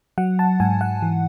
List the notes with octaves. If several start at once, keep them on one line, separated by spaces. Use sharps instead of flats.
F#3 F#5
A5
G#2 G#5
F#5
E3